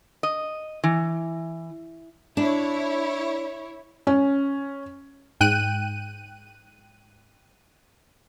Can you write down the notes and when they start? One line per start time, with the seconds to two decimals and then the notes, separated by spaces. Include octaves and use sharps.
0.23 D#5
0.84 E3
2.37 D4 E4 C#5
4.07 C#4
5.41 G#2 G5 F#6 D#7